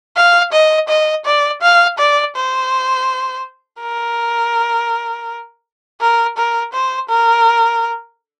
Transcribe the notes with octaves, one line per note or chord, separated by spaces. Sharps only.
F5
D#5
D#5
D5
F5
D5
C5
A#4
A#4
A#4
C5
A#4